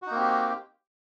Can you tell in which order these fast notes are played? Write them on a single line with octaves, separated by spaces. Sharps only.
F#4 D#4 A#3 C4 G4